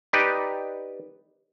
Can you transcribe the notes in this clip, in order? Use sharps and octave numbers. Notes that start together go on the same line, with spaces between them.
D#4 G4 B4 D5